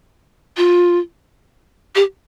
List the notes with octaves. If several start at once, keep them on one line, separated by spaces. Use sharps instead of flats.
F4
G4